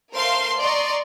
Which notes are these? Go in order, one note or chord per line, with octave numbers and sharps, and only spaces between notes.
A3 A#4 C5 F5 C6 C7
D5 D#5 A#5 C6 C#6